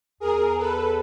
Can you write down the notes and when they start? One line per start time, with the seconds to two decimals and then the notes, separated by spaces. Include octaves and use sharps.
0.20 E2 G#4 A#4
0.58 A4 B4